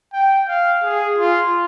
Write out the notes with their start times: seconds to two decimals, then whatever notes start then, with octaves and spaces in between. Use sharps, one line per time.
0.13 G5
0.48 F5
0.83 G#4
1.18 F4